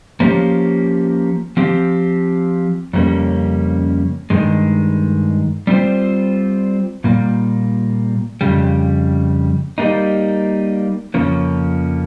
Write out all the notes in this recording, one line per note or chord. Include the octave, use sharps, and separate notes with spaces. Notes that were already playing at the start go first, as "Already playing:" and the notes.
F3 A#3 C#4 G4
F3 C4 G4
F2 C#3 G3 A#3 C#4
G2 D#3 G#3
G3 C4 F4 C5
A#2 G3 A#3
F2 C#3 G3
G3 A#3 D#4
F2 C#3 F3 A#3 C#4